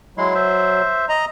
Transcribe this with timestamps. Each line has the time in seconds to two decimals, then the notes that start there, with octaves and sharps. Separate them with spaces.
0.18 F#3 G#3 E4 C6
0.35 C5 E5
1.09 D#5 A#5